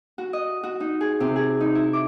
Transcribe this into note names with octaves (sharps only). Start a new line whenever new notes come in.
F#4
D#5
F#4
D#4
G#4
C3
G#4
D#4
E4
D6